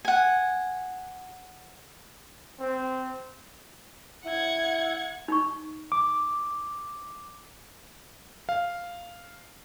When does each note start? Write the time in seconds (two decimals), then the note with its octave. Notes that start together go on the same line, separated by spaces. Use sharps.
0.05 F#5 G#5
2.60 C4
4.25 E4 F#5 G#6
5.28 D#4 C#6
5.92 D6
8.49 F5